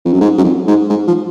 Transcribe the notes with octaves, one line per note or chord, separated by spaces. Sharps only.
F2
F#2
G#2
F#2
F2
G#2
G#2
F3